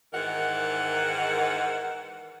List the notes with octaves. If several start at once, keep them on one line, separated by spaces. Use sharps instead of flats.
G#2 D#3 E3 A#4 F#5